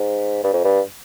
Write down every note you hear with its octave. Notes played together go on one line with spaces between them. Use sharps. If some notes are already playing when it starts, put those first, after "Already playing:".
Already playing: G#2
G2
F2
G2